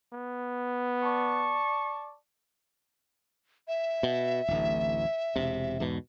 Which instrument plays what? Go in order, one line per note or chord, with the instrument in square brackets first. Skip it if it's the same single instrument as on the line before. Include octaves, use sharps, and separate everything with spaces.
[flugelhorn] B3
[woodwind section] D5 A5 C#6
[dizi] E5
[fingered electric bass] B2
D1 A1
E1 C3
E2 G#2 B2